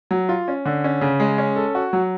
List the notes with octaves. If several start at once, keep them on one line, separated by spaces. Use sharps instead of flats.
F#3
F4
C#4
D3
C#4
C#3
G#3
C#4
A4
F#4
F#3